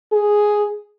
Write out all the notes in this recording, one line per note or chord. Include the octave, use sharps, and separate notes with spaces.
G#4